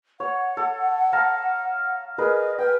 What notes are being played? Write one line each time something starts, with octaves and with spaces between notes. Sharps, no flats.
C#5 F#5
A4
F5 A5 A#5
G#4 A#4 B4 D#5
B4 G5